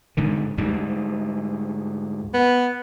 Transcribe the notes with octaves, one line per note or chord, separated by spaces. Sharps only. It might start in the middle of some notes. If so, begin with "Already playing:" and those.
G#2 D3 D#3
D2 G#2 G3
B3